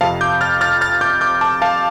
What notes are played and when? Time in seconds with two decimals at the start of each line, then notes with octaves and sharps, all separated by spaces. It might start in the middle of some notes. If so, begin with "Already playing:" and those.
0.01 F2 C3 F5 A5
0.21 D6 G6
0.41 F6 A6
0.61 F6 A6
0.81 F6 A6
1.01 D6 G6
1.21 D6 G6
1.41 A5 D6
1.62 F5 A5